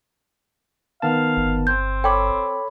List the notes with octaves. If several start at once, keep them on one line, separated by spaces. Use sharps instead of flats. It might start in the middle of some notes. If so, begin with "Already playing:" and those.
D#3 B3 F5 A5
G1
C4 G6
A4 C#5 G5 B5 D6